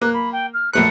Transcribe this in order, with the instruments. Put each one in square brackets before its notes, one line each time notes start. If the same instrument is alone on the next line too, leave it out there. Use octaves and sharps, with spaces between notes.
[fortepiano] A#3 [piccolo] F#6
[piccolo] B5
G5
F6
[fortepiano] A#1 A3 F#6 [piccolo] C#7